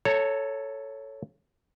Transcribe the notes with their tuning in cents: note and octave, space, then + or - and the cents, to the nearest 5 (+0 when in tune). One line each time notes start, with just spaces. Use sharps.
A4 +0 C#5 +0 A#5 -35